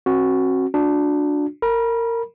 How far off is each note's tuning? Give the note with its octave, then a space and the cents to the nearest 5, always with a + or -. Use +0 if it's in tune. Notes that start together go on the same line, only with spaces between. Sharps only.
C4 +40 F#4 +0
D4 +0 F#4 -35
A#4 -20 B5 -30